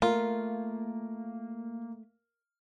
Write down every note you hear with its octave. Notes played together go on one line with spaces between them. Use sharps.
A3 A#3 F4 A#4